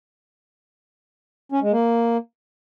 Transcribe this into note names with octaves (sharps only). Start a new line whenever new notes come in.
C#4
G#3
A#3